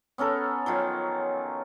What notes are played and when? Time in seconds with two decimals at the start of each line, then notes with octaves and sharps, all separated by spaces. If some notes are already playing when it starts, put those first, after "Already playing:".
0.18 B3 C#4 A4 A#4
0.66 D#3 F3 F#3